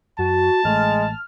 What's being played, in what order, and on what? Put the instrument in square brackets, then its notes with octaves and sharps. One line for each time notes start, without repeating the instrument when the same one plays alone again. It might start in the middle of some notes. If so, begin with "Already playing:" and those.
[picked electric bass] F#2 [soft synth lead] F#4 [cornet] A5
[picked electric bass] A1 A3 [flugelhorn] G#3 [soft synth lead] F6